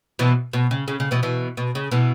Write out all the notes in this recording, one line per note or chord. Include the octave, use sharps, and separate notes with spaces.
B2 E3
B2
C#3
C#3
C#3
B2 E3
B2 E3
B2
C#3
B2 E3